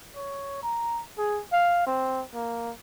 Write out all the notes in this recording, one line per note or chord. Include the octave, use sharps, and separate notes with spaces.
C#5
A#5
G#4
F5
C4
A#3